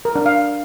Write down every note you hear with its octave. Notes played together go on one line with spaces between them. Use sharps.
A#4
D4
F5